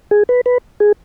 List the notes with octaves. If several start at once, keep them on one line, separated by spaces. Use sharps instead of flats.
G#4
B4
B4
G#4